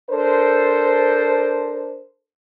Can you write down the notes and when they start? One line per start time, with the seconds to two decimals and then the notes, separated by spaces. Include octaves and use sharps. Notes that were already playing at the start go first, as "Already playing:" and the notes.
0.10 D4 A4 A#4 C5